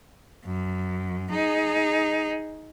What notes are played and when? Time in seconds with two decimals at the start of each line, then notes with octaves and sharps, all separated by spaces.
0.46 F#2
1.31 D#4 G#4